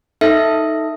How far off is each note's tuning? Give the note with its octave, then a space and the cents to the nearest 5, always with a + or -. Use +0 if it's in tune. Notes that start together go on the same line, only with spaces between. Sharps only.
D#4 +10 A4 +5 E5 +0